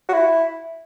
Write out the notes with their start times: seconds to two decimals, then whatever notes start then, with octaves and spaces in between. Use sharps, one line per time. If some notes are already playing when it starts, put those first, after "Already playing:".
0.09 F#4
0.13 E4